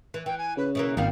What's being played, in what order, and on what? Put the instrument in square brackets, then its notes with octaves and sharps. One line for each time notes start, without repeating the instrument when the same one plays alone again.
[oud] E3
[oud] E3 [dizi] G5
[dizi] G#5
[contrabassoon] C#3 [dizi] B4
[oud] B2 E3 A#3 [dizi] E5
[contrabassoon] D#1 [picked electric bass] G#1 [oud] D#3 G3 [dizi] F5